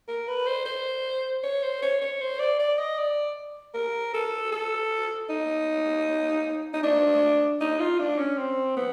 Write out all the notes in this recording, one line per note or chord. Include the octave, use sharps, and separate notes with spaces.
A#4
B4
C5
C5
C#5
C5
C#5
C#5
C5
D5
D5
D#5
D5
A#4
A4
A4
D#4
D#4
D4
D#4
F4
D4
C#4
C4
B3